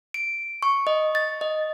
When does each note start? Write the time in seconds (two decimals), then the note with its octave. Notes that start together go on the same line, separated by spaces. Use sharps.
0.14 D7
0.63 C#6
0.87 D#5
1.15 A6
1.41 D#5